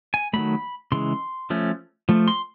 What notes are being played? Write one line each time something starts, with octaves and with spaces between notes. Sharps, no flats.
G#5
D#3 F#3 A3 B5
C#3 E3 G#3 C6
F3 A3 C#4
F3 A3
C6